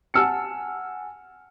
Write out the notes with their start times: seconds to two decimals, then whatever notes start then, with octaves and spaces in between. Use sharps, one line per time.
0.14 F#5 G#5 A5 E6 F6 C#7